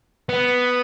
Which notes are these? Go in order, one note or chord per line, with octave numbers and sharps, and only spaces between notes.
B3